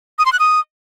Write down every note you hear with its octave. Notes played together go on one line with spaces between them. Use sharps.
D#6
C6
F#6
D#6